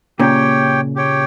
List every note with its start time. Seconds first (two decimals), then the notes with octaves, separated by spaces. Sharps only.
0.19 A#2 C#3 G4 C#5 G5
0.96 G4 C#5 G5